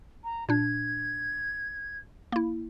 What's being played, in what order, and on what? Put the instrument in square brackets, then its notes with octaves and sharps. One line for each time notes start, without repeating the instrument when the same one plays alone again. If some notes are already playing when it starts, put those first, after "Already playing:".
[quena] A#5
[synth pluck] A#2 D4 [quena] G#6
[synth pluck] A#3 E4